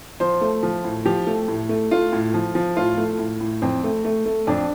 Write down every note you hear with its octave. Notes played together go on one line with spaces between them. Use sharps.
F3 C5
A3
F3
A2
F3 G4
A3
A2
A3
A3 F4
A2
F3
F3
A2 F4
A3
A2
A2
F2 C4
A3
A3
A3
F2 D4